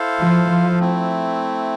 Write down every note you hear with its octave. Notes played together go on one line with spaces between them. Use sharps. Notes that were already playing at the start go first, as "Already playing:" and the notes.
Already playing: E4 A4 C5 F5
F3
F3
A3 C4 E4